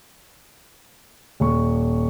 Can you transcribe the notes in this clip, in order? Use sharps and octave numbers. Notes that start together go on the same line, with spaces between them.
D#1 C#6